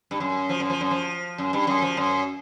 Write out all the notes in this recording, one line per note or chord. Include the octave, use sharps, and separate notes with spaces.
G2
F#2
F3
F#2
F3
F#2
F3
F#2
G2
F#2
F3
F#2